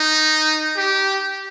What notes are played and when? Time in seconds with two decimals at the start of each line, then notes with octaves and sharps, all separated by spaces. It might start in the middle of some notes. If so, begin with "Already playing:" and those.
Already playing: D#4
0.77 G4